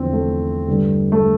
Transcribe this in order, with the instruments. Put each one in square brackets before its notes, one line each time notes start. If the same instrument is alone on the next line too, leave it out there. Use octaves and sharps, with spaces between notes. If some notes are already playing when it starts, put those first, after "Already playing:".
Already playing: [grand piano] E2 D3 F3 C4
A3
G2 D3 G3
A3